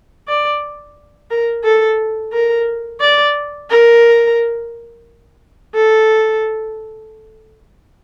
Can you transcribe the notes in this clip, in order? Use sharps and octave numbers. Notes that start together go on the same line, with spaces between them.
D5
A#4
A4
A#4
D5
A#4
A4